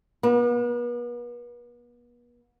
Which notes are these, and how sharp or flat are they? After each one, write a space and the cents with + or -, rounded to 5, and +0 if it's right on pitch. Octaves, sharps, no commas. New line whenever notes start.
B3 -40